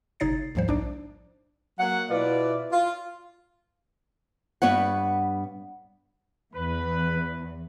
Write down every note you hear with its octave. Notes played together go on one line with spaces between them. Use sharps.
G1 C3 D#4 C#5 A6 C7
D2 G#2 F3 G3 C5
A#1 D4 D#4 D5
F#3 A#3 F#5
B2 E4 F4 B4 D5
F4
G2 B3 C#5 F#5
E2 B4